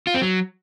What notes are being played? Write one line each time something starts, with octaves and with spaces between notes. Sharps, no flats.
F4
C4
F#3